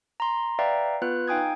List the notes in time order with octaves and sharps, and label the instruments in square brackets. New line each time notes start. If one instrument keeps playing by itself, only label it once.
[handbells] A#5 C6
B4 D5 E5 F5 G5 A#5
B3 F4 B4 F#6 G6
D#4 F5 G5 G#5 D#6 G#6